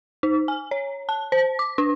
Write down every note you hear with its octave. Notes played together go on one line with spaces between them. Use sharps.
D#4
G#5
C#5
A5
C5
D6
D4